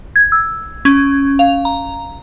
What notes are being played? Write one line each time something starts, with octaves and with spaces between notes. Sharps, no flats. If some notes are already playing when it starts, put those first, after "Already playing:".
G#6
E6
C#4
F5
A#5